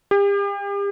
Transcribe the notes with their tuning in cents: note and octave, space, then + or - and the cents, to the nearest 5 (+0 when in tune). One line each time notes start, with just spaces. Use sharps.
G4 +40